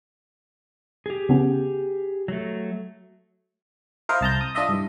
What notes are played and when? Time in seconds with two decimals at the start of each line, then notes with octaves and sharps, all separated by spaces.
1.06 G4 G#4
1.29 C#3 B3 C#4
2.28 F#3 A3
4.09 E4 A#4 C5 D#5 F5
4.21 C2 A5 A#5 G6
4.41 D#6
4.55 D4 F4 D#5 E5
4.69 G2 E3